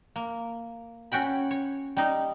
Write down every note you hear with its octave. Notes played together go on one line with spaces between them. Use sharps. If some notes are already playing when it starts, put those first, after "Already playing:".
A#3
C#4 F#4 G5 B5
C#5
G3 D#4